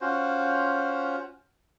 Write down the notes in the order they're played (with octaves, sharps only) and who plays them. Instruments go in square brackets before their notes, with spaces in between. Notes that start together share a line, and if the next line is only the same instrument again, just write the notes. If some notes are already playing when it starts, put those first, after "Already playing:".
[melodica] C#4 F4 F#4 C5